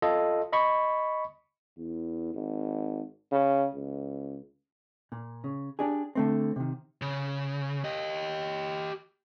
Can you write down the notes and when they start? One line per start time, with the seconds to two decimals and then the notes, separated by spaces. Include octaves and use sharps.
0.02 F4 A4 D#5
0.53 D#5 B5 C#6
1.78 E2
2.34 G#1
3.32 C#3
3.75 C#2
5.12 A#2
5.44 C#3
5.79 D4 G4 G#4
6.15 D3 A3 C4
6.56 C3 D#3
7.02 C#3
7.84 G4 D#5